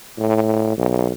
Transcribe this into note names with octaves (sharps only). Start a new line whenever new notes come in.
A2
B1